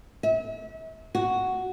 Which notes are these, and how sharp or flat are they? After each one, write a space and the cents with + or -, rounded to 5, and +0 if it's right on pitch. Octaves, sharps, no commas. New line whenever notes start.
E5 -35
F#4 +5